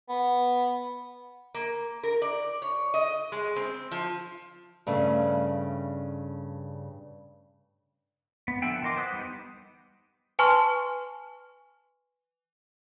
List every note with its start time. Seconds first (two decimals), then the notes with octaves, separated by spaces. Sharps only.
0.09 B3
1.54 A#3
2.04 A#4
2.22 D5
2.62 C#5
2.94 D#5
3.32 G#3
3.56 C4
3.91 F3
4.87 G2 C#3 A3
8.48 B3
8.62 D3 F3 E5 F#5 G5
8.83 E3 A#4 D#5 C6 D6
8.96 B3 C5 F#5 D#6 F#6
9.12 G3 B3 D#4
10.39 B4 G#5 A5 C6 C#6 F6